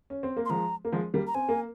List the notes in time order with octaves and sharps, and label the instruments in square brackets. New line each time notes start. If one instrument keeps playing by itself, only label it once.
[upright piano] C#4
C4
A#3
[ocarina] C6
[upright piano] F3 G#3 [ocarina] A#5
[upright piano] A#3
F3 G#3
G3 A#3
[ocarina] A#5
[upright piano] C4 [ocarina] G#5
[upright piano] A#3